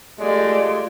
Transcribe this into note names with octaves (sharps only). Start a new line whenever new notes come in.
G#3 A3 F4 G4 D5